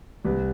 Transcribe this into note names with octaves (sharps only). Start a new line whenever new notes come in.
C2 B4